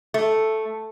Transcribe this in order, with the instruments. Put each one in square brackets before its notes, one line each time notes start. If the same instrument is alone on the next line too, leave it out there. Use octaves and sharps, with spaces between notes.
[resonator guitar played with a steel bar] A3